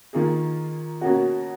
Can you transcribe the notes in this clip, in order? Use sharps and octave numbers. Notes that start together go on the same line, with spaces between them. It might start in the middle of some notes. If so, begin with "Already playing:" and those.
D#3 A#3 F4 G#4
B2 A#3 C#4 F#4